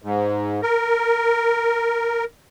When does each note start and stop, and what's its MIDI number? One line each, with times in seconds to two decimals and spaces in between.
0.02 0.61 44
0.62 2.24 70